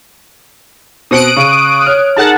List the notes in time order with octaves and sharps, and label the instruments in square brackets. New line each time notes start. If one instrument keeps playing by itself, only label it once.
[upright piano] B2 C4 C#7 [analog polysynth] D#6 F#6 D7
[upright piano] C#3 [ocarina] C#6
[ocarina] C#5 [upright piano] F6
[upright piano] D#4 G#4 A#4 [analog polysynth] F#5 A5